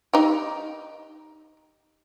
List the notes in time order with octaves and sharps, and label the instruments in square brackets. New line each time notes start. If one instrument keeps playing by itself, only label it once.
[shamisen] D#4 G4